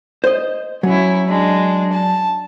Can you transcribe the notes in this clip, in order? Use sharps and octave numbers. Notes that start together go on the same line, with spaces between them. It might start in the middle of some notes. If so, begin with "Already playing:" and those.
C5 D#5
F#3 C#4 E4
G#3 D4
A5